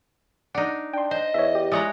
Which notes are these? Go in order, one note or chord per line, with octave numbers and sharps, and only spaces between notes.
D4 D#4 F#5
D4 G5 C6
C5 D#5
E2 C#5 E5
G4
G#3 E4 C#5 D5 A#5 D#6 F#6